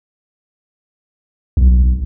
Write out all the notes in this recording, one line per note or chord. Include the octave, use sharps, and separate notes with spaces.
B1